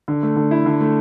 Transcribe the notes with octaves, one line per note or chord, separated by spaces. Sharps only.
D3
A3
D3
E4
D3
A3